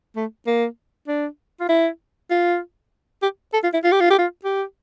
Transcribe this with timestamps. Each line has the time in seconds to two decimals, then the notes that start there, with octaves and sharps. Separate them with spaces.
0.16 A3
0.47 A#3
1.08 D4
1.60 F4
1.69 E4
2.31 F4
3.22 G4
3.53 A4
3.63 F4
3.73 E4
3.84 F4
3.92 G4
4.01 F4
4.10 G4
4.19 F4
4.44 G4